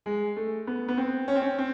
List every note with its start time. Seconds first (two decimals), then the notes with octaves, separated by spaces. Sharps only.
0.06 G#3
0.36 A3
0.67 B3
0.88 B3
0.97 C4
1.28 C#4
1.35 C4
1.42 C#4
1.58 C4